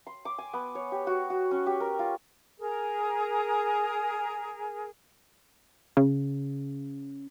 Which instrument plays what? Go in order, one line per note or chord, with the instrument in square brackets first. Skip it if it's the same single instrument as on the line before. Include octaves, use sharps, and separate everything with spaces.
[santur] C6
D6
G#5
B3
C#5
G4
F#4
F#4
C#4
G4
A#4
F4
[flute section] G#4 A#4
[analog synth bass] C#3